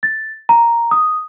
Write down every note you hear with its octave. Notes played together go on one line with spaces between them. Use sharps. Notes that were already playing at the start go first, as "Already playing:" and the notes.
A6
A#5
D#6